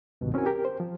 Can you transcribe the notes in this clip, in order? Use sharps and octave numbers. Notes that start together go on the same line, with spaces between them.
C#2 G2 B2 D#3
C4 C#4 E4 F#4 A#4 G#5
G4 A#4
C5
F3